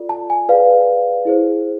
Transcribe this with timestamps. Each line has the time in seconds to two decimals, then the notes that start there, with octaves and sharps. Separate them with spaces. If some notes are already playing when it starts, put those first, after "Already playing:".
Already playing: F4 A4 D5
0.09 A5
0.30 G#5
0.49 G#4 B4 D5 F5
1.25 E4 G#4 C5